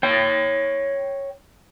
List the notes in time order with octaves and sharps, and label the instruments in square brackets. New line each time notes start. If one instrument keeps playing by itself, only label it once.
[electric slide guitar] C#5 G5